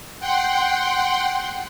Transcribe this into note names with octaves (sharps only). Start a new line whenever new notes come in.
F#5 G5 C6